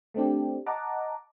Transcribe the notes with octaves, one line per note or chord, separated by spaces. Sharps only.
A3 C4 D4 G4
D#5 F#5 A5 A#5 D6